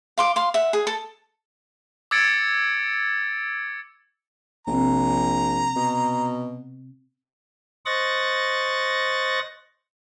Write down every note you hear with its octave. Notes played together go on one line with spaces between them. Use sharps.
F5 C6 D6
F5 C6
E5 F#5
G#4
A4
D6 E6 G#6 A6 C#7 D7
A#1 C3 C4 A#5
B2
C5 D#5 C#6 F#6 A6 A#6